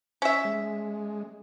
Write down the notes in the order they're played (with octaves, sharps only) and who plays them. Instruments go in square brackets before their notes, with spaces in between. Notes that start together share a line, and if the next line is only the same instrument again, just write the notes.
[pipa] C#4 E5
[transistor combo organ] G#3